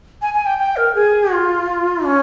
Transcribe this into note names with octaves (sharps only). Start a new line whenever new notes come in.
G#5
G#5
G5
G5
A#4
G#4
F4
C#4